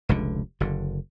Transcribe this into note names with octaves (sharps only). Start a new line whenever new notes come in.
F1 C#2 B2 D3
F#1 D3